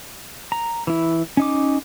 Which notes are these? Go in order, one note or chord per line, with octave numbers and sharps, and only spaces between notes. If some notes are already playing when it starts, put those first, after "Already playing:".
A#5
E3 E4
C#4 D#4 D6